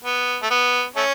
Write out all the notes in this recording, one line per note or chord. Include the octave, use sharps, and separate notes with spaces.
B3
A3
B3
A3 C#4